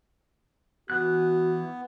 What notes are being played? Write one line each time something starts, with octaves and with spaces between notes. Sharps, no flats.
E3 B3 F#4 F#6